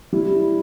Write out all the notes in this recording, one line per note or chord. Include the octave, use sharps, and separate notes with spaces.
G3 E4